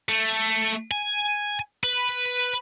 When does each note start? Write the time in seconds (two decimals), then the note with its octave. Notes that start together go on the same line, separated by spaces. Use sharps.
0.09 A3
0.91 G#5
1.84 B4